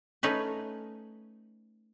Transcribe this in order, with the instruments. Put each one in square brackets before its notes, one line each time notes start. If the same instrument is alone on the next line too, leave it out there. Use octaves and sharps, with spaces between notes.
[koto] A3 C#4 D#4 B4